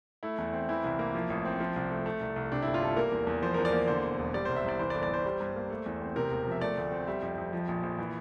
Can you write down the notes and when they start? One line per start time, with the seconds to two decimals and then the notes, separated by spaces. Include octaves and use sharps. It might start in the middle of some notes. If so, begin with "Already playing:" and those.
0.23 A3 E4
0.38 E2
0.53 C4
0.69 E3 E4
0.84 C2
0.99 A#3
1.15 F3
1.30 A1
1.45 C4
1.60 F3
1.76 C2
1.91 A3
2.06 A3
2.20 C2
2.36 C2
2.52 C3 D4
2.62 G1 E4
2.74 F4
2.81 G3 A4
2.97 A#3 A#4
3.12 E2
3.27 E2
3.42 F3 C5
3.54 E2 A#4
3.65 D5
3.72 A#3
3.88 D3 C5
4.03 E1
4.19 E1
4.34 G3 D5
4.45 C2 C5
4.56 E5
4.64 C2 D5
4.79 E3 C5
4.90 D5
4.94 G1
5.03 D5
5.09 G1 C5
5.25 G3
5.40 G2
5.56 A#3
5.70 A3
5.86 E2
6.01 C4
6.16 C3 A#4
6.31 E1
6.46 F3 E5
6.61 A3 D5
6.77 D2
6.91 C4
7.07 G3 E5
7.22 F2
7.38 F2
7.53 F3
7.69 A#1
7.83 A#1
7.98 E3